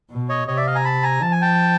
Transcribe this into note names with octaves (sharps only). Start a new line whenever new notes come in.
B2
C#5 D#5
C3 C#5 D#5
D5 E5
D#5 F5
G#5 A#5
A5 B5
G#5 A#5
F3 A5
G#5
G5 A5